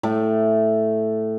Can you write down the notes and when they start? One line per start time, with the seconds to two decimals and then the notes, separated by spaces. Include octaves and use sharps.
0.03 A2 A3